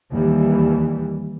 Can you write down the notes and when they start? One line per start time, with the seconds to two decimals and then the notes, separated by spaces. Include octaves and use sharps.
0.11 D#2 E3 G3